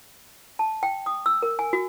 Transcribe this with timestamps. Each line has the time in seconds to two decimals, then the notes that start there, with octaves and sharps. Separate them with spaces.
0.59 A5
0.83 G5
1.06 D#6
1.26 E6
1.42 A#4
1.59 G#5
1.73 F#4